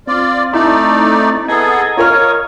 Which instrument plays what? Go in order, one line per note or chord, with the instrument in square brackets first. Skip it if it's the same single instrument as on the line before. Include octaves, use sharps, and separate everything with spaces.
[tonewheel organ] C4 [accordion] F4 D5
[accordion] A3 D#4 D5 [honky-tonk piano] E4
[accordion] B3 G#4 A4 [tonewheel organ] D#5 A#5 G#6
[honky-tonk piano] F4 A#4 F6 [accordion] C#5